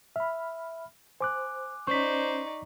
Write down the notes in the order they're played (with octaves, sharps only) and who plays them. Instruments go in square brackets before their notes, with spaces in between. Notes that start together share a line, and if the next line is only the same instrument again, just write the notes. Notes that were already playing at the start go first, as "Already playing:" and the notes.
[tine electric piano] E5 [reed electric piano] B5 F6
[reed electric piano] C5 [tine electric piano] G#5 D6 F#6
[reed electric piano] C#4 [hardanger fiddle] D#4 D5 [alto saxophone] C5 [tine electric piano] C#6 B6